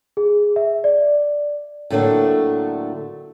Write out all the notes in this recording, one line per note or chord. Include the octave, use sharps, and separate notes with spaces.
G#4
E5
D5
A2 D3 F#3 A3 A#3 D4